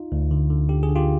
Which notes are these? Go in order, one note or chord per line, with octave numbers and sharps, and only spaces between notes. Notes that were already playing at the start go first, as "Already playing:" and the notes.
Already playing: D#4 F4
D2
D3
D3
D3 G4
G#4
D3
F4 G4